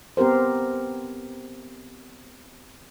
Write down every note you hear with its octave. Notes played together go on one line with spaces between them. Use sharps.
B3 C4 G4 A#4 C5